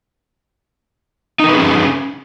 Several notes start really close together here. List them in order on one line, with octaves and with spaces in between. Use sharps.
D#4 A#4 B4 G#4 C#4